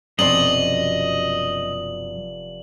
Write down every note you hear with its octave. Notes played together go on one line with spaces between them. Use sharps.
F1 F#2 B2 C4 D5 D#5 A6 F#7